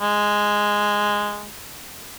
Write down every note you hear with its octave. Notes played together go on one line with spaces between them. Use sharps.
G#3